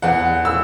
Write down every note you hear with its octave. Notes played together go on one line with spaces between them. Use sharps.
E2 F#5
E6